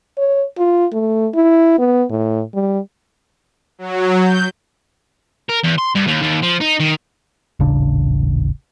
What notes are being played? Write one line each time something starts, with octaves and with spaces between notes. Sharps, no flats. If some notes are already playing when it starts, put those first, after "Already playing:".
C#5
F4
A3
E4
B3
A2
G3
F#3
G6
A#4
E2
C6
G2
D#2
D#2
F3
D#4
D#3
D#1 A1 C#3 D4